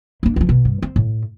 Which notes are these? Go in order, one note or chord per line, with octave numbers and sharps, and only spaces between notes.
A#3 D4
C#2 F3
B2
G2
C4
A2